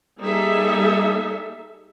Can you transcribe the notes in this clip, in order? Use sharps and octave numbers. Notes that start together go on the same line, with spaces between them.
G3 A#3 D#4 G#4 A4 E5